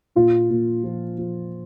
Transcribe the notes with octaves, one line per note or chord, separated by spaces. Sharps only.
A#2 F4
A#2
F3
F3